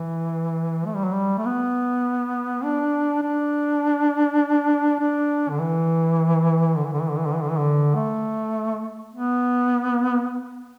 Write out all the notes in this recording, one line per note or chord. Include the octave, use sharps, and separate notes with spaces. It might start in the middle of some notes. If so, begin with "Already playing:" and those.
Already playing: E3
A3
G3
F#3
G3
A3
B3
D4
D4
D4
D3
E3
D3
E3
D3
E3
D3
E3
D3
E3
D3
E3
D3
A3
B3